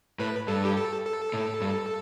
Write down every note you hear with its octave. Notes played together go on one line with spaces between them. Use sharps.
A2 B4
G2 A4
G4
A4
A4
A2
G2